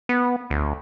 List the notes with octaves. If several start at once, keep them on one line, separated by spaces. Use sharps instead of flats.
B3
D2